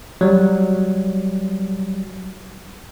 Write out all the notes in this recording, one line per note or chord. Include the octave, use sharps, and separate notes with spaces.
F#3 G3